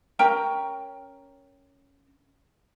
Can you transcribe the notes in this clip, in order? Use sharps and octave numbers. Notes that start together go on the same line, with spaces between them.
C#4 A#4 G5 A#5